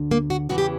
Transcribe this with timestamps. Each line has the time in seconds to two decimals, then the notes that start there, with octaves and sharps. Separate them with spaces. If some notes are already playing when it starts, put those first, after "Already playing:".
Already playing: D2 D3
0.11 A#3
0.30 F#4
0.49 E2 C#3 E3 F#4
0.58 G4